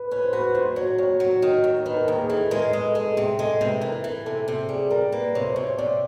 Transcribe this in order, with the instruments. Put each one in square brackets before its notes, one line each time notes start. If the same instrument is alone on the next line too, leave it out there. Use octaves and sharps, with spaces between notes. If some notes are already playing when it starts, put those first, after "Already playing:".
Already playing: [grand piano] B4
[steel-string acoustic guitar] C#4 [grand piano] B4
[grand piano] C5
[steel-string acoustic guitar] F#4 [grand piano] B4
[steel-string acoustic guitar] D#2 [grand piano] C5
[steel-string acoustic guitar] F#3 [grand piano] C#5
[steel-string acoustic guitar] D#2 [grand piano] C#5
[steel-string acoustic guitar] F#3
D#3
D#2
[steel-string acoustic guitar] D#3 [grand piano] B4
[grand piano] A#4
[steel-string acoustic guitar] D#2 [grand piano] A#4
[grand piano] G#4
[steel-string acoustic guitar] E3 [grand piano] A4
[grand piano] B4
[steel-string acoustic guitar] G#3 [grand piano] A#4
[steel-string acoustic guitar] G#3 [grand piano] B4
[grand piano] A4
[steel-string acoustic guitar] G#3 [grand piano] A4
[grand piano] G#4
[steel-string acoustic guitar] C3
[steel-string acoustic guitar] G#3 [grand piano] A4
[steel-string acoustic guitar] C3 [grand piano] B4
[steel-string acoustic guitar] E3 [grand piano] A#4
[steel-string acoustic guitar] E3 [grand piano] A#4
[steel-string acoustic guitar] C3 [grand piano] A4
[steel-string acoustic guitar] C3 [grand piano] A4
[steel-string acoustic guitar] G3 [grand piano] G#4
[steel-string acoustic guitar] G3 [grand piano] A#4
[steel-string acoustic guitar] A#3 [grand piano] B4
[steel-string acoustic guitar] C3 [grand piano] C#5
[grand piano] C5
[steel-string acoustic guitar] C3 [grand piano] C#5
[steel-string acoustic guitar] C3 [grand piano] D5